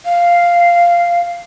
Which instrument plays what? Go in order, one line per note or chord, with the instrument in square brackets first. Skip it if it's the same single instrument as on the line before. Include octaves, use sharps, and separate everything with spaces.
[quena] F5